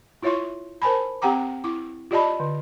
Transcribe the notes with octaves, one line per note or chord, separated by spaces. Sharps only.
E4 F4 C#5 E5 C6 C#6
A#4 C5 G#5 A5 B5
C4 G4 F#5 G5 A#5 D6
E4 D6
F4 G4 D5 D#5 A5 B5
D3